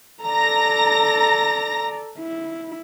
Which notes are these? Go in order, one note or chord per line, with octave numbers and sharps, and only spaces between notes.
A4 D5 A#5 A#6
E4